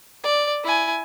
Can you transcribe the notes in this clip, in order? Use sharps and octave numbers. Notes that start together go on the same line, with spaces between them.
D5
E4 G#5